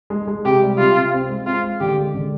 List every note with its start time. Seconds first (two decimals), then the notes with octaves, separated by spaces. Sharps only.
0.10 G#3
0.27 G#3
0.45 C3 G4
0.62 G3
0.78 C3 F4
0.95 C3
1.13 C4
1.29 G#3
1.46 C4 F4
1.64 G#3
1.80 D3 G4
1.98 G#3
2.14 D3